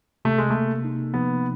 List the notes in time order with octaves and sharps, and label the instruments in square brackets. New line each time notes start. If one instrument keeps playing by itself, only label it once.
[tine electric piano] C3 [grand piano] A3
[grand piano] G#3
[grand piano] A3 [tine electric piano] A#3
[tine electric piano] D#4
[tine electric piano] F3 [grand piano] B3